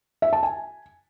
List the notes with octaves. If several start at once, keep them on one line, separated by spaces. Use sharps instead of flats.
E5
A5
G#5